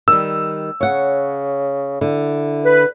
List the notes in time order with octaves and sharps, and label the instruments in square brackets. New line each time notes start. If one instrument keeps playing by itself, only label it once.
[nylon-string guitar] D#3 G3 [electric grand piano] E6
[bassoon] C#3 [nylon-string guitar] C#5 F#5
[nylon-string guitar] D3 [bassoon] E4
[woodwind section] B4